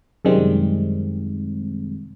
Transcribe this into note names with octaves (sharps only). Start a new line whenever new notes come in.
F#2 C3 D#3 G3 G#3 C4